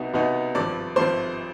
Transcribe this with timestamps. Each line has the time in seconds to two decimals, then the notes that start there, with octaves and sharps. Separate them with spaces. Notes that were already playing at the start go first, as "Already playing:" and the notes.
Already playing: C2 B2 B3 D#4
0.14 C2 B2 B3 D#4
0.55 G#1 G2 F3 D5 D6
0.96 G#1 G2 F3 C5 C6